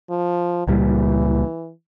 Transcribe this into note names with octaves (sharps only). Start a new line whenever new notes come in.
F3
C#2 A#2 E3 G3